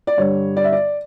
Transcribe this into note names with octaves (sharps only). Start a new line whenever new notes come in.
D5
G2 D3 G3 C#5
D5
E5
D5